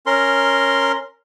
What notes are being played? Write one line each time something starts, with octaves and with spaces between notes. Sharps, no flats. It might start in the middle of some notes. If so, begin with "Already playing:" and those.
C#4 A#4 C6